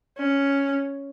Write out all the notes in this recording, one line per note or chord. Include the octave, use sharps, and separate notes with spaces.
C#4